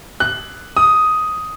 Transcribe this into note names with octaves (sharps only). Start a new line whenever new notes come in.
F#6
D#6